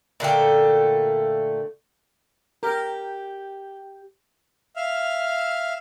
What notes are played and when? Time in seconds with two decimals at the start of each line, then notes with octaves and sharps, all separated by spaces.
0.20 A#2 D3 A3 G5
2.63 G4 A#4
4.76 E5 F5 F6